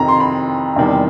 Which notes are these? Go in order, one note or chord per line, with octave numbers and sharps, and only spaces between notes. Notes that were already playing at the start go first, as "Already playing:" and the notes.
Already playing: F2 C3 D#3 A#5
C6
B5
E2 C3 D#3 G3